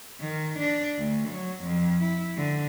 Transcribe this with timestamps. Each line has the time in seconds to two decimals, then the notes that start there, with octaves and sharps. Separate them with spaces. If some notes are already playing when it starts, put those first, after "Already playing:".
0.21 D#3
0.59 D4
0.99 D2
1.30 F#3
1.64 F2
2.00 E4
2.37 D3